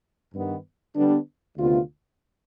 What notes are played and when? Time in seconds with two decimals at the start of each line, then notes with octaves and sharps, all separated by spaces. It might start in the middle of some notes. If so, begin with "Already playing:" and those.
0.34 G2 D#3 B3
0.95 D3 G3 B3 D4
1.57 D2 C3 D#3 B3 F4